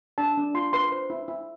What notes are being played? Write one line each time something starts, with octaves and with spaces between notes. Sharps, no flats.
D4 A5
D4
F4 C6
B4 C6
C5
E4
E4